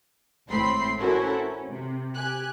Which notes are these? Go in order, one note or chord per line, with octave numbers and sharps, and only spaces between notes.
G#1 A2 C4 B5 C6 C7
C#4 E4 F#4 A4 A#4 C5
C#4
C3
G4 G#5 F#6